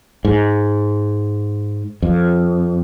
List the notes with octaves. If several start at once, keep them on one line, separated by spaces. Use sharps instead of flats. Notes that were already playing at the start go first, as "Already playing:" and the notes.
G#2
F2